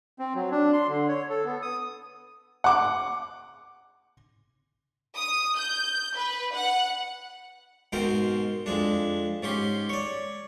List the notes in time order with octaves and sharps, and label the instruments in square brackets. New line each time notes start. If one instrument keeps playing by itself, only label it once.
[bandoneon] C4
F#3
D4
C6
D3
C#5
A4
B3
D#6
[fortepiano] F#5 D6
[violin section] D#6
G6
B4
F#5
[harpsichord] G#2 B2 C4 A#4 G5 C6
F2 G#3 D4
G#2 C#4 G4 C6
C#5 D5